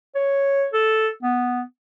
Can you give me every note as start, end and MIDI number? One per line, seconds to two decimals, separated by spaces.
0.15 0.66 73
0.73 1.08 69
1.23 1.61 59